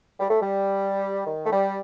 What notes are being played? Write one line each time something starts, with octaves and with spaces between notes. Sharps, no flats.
G3
A3
G3
D#3
A3
G3